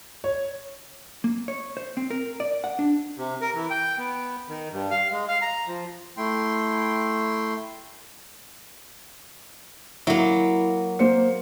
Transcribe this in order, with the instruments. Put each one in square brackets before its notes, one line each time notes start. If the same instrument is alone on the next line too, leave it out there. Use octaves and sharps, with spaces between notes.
[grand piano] C#5
[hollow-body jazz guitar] A#3
C#5
C5
C4
A#4
D5
F#5
D4
[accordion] C3
A#4
E3
G5
B3
D#3
G2
F5
G#3
F5
A#5
F3
[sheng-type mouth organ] A3 E4 G5 C6
[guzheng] F#3 A#3 [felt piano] E4
[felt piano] A#3 C5 C#7